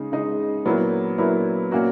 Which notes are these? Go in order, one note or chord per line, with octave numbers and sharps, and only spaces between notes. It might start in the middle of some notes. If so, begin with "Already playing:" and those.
Already playing: C#3 G#3 D#4
C#3 G#3 D#4
A#2 F#3 B3 E4 A#4
A#2 F#3 B3 E4 A#4
A#2 A#3 C#4 F#4 A#4